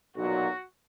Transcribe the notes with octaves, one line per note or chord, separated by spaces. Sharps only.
B1 A#2 F#3 F#4